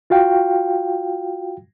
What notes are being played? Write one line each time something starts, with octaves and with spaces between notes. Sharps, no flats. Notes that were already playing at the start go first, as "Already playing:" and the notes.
F4 F#4 F5 G5